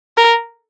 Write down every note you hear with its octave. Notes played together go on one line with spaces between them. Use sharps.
A#4